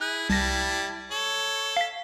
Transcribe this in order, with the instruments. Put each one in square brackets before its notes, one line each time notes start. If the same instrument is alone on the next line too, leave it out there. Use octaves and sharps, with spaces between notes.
[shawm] E4 [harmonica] G#4 [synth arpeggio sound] F#6
[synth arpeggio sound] C2 A#6 [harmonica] G3 A5
[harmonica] A4 [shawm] C#5
[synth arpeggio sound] F5 B6